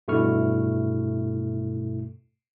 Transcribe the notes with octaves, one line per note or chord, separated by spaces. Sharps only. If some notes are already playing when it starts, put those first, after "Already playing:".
G2 B2 A3 E4 C#6 F6